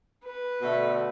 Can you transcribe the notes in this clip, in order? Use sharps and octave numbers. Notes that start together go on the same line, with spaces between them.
B4
B2 D3 A3